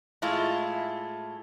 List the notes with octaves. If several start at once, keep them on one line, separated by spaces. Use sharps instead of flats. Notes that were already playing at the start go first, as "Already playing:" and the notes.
A2 G#3 A3 E4 F4